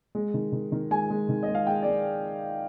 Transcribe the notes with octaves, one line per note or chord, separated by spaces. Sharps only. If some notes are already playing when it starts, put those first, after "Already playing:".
G#3
D#3
D#3
D#3
G#3 G#5
G#3
D#3
D#5
G#3
F5
G#3 G5
G#3 D5